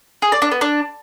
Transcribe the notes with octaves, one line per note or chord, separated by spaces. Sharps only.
G#4
D5
D4
B3
D4